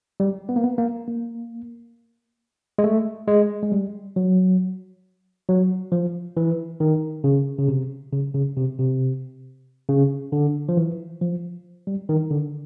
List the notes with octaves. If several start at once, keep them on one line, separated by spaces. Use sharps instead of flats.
G3
B3
A#3
B3
A#3
A#3
G#3
A3
G#3
G#3
G3
F#3
F#3
F3
E3
D#3
C#3
C#3
C3
C#3
C#3
C3
C3
C#3
D3
F3
E3
F3
G3
D#3
D3